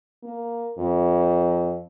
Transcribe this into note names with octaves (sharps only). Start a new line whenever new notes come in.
A#3
F2